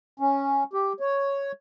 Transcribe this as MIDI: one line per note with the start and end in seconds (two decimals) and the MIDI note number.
0.20 0.64 61
0.73 0.93 67
1.00 1.52 73